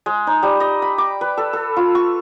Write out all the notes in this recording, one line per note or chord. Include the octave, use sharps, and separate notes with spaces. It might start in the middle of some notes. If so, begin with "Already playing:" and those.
G#3
D#4
G3
D#5
B5
D6
B4
A4
A4
F4
C#6